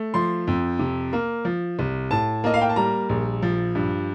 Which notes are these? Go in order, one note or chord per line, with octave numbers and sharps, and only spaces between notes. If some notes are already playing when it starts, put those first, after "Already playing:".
Already playing: A3
F3 C6
F2
C3
A#3
F3
C2
A2 A5
A#3 D#5
F5
G5
A5
G3 A#5
A#1
F3
G2